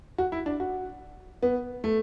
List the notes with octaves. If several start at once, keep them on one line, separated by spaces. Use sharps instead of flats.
F#4
E4
D4
F#4
B3
A3